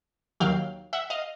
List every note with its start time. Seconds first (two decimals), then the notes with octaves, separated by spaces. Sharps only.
0.40 D#2 D#3 F#3 F5 G5
0.93 E5 F#5
1.10 D#5 F5